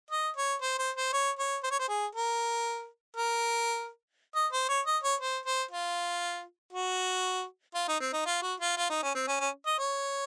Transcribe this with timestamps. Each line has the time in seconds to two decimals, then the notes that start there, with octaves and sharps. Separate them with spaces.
0.11 D#5
0.36 C#5
0.62 C5
0.79 C5
0.96 C5
1.13 C#5
1.39 C#5
1.64 C5
1.71 C#5
1.79 C5
1.89 G#4
2.15 A#4
3.17 A#4
4.35 D#5
4.52 C5
4.69 C#5
4.86 D#5
5.03 C#5
5.20 C5
5.46 C5
5.71 F4
6.73 F#4
7.74 F4
7.88 D#4
8.00 C4
8.13 D#4
8.26 F4
8.42 F#4
8.60 F4
8.77 F4
8.90 D#4
9.03 C#4
9.15 C4
9.27 C#4
9.40 C#4
9.66 D#5
9.79 C#5